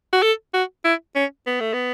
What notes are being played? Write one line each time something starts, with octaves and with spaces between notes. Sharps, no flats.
F#4
A4
F#4
E4
C#4
B3
A3
B3